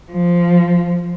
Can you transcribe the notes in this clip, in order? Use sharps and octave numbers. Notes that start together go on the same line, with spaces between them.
F3